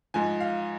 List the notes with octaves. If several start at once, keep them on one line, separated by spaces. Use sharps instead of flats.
G#2 F3 G#5
F5